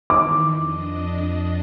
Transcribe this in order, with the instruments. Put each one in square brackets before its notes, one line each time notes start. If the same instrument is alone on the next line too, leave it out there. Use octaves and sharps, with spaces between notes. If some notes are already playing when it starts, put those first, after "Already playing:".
[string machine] D#3 E3 [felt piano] D6
[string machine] F2 D4 D#5